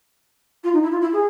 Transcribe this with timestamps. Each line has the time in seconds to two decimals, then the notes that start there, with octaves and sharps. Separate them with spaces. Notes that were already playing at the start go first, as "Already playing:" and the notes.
0.64 F4
0.73 D#4
0.83 E4
0.92 F4
1.01 E4
1.13 G#4